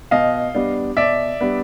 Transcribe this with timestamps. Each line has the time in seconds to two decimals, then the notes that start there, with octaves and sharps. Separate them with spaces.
0.11 B2 D#5 F5
0.55 G3 B3 D4
0.97 B2 D5 E5
1.40 G3 B3 D4